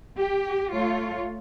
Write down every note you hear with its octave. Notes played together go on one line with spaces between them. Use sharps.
G4
A3 F4 C#5